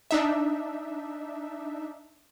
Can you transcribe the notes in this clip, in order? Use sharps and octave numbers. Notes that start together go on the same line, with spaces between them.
D4 D#4 E5